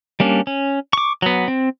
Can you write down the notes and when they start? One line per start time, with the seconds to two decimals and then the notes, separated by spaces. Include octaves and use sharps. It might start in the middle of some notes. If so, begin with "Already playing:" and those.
0.20 G3 A#3 C#4 D4
0.47 C#4
0.93 C#6 D6
1.22 F#3 B3
1.48 C4